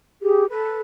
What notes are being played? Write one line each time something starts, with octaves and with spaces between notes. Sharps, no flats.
G4 G#4
A4 B4